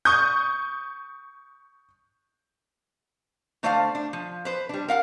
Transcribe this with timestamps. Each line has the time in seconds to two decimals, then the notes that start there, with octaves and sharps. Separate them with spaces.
0.05 C#6 D#6 G6
3.63 D3 A3 C5 D5 D#5 F5
3.95 D4
4.13 F3
4.45 B4 C5
4.69 G3 D4
4.88 A#4 F5 F#5